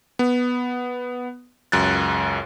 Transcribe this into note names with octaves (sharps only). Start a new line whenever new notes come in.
B3
C#2 F#2 F#6 A6